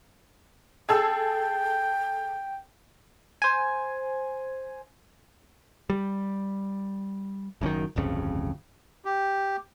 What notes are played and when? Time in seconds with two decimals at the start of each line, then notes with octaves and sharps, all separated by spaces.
0.89 G#4 A4 G5 E6
3.42 C5 G#5
5.90 G3
7.61 F#1 F#2 B2 D#3
7.96 D1 G1 F2 C#3
9.05 G4